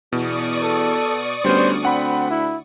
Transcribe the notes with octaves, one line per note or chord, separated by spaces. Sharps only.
E2 B2 D5 C#6 D#6
A4
D2 G3 B3 C#4 C5
C4 D4 F#5 B5
E4